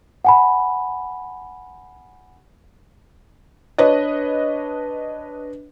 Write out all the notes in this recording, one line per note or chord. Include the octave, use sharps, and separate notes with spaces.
F#5 G#5 B5
D4 B4 C#5 D#5